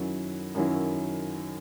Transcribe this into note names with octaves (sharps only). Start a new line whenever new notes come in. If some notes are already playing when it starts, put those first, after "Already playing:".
Already playing: F#2 D#3 F#3 C#4 E4
F#2 D#3 F#3 C#4 E4